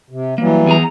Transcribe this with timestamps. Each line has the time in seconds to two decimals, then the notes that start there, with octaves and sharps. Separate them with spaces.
0.10 C3
0.38 E3 F#3 G3 A#3
0.67 E2 G#4 A#5